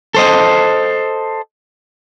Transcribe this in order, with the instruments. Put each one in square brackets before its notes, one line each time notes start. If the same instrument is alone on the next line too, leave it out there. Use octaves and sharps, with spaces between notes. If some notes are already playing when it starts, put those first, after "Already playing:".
[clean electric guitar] A4 C5 D#5